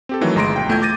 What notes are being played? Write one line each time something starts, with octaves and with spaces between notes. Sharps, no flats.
C4 G4 A4
D#3 E3 F#3 A3
G1 G#3 A#5 C6 A#6 D7
B1 G5
E2 A3 F4 G5 G6 G#6
D6 G6 A6 A#6 D#7